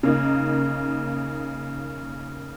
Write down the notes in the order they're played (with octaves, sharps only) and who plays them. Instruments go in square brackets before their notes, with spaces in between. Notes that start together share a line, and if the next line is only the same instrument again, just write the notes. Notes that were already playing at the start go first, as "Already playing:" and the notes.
[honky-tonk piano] C#3 A#3 D#4